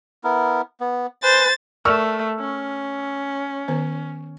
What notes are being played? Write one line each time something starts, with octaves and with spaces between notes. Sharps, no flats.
B3 E4 A#4
B3
B4 C5 G#5 A6
A3 A#4 D5 C#6 E6 F6
C#4
D#3 B3 C5